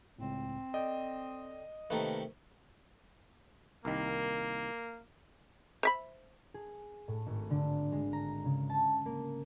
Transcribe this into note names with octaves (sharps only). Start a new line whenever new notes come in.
C#2 A2 C4
A4 D5 D#5 G5
C3 D#3 A3 A#3 B4 A5 A#5
C2 D#3 A#3
C5 E5 B5
G#4
A2
G#1
D3
G#3
A#5
C#3
A5
A#3